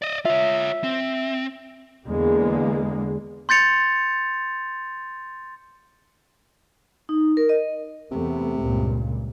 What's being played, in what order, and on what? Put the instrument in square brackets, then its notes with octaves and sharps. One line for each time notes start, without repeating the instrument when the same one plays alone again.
[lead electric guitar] D5 D#5
[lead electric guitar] F4 C#5 [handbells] E5
[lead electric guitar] C4
[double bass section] E2 D3 G#3 A#3
[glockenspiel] C6 G6 A6 C#7 F7
[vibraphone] D#4
A#4
D#5
[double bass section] E2 A3 B3 [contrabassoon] C3
[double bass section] C#2 G2 A#2